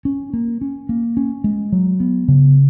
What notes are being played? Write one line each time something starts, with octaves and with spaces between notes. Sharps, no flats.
C#4
A#3
C#4
A#3
C#4
G#3
F#3
B3
C#3